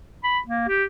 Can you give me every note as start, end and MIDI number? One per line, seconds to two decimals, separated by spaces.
0.24 0.39 83
0.47 0.65 58
0.69 0.84 67